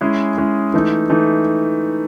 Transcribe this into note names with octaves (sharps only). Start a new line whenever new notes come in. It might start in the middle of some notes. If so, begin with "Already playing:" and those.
G#3 C#4 E4 G#4
G#3 C#4 E4 G#4
E3 A3 D#4
E3 A3 D#4